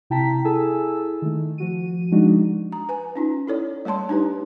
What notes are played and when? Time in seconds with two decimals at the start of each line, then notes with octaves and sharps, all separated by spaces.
0.10 C3 E4 G5 A5 A#5 B6
0.45 E4 G#4 A4 G#5 A5 E6
1.22 D#3 A3
1.58 F3 F#4 D#7
2.11 F3 G#3 D4 D#4 F#4
2.72 A#5
2.89 B4 G#5
3.15 C#4 D#4 F4
3.47 E4 A4 C#5 D5
3.85 G3 A3 C#5 A5 C6
4.09 D4 D#4 G4 B4